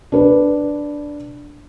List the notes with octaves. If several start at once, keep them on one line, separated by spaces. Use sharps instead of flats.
D4 B4